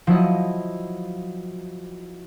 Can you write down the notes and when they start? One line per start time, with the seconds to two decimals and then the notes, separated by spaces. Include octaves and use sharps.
0.07 F3 F#3 E4 D#5